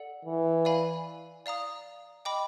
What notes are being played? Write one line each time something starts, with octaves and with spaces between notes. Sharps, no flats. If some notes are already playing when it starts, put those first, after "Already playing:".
Already playing: A4 D5 F#5
E3
D5 F5 G#5 B5
D5 F5 A#5 D#6
D#5 G5 B5 D6